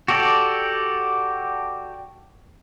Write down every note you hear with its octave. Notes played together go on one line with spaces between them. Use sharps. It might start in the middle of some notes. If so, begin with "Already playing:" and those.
F#4 G4 A4 D5